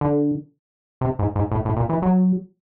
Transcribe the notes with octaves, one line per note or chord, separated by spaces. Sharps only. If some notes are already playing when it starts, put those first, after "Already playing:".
D3
C3
G#2
G#2
A2
A2
A#2
E3
F#3